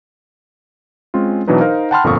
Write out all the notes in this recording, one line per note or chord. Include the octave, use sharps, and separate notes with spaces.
G#3 C4 C#4 F4
B2 E3 F#3 D4 D#4 B4
D#4 A#4 C5 F5
F#5 G5 A5 B5 C6 F6
G1 F2 A#2 A4 C#6 D#6